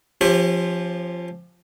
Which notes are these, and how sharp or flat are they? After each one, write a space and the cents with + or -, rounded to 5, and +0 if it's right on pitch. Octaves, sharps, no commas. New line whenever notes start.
F3 +0 C#4 -30 G4 +15